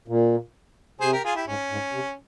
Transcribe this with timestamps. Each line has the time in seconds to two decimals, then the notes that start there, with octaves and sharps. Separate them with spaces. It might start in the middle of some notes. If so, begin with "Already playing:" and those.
0.08 A#2
1.00 C3 G#4 C5
1.12 G4 A#4
1.24 F4 G#4
1.35 E4 G4
1.47 G#2 C#4
1.70 G#2
1.93 C3